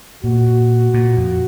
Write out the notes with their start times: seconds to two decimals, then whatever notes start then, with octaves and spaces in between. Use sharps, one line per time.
0.24 A#2 F#4
0.94 A#2
1.17 F2